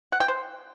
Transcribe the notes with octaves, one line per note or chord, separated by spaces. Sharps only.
F#5
G5
C5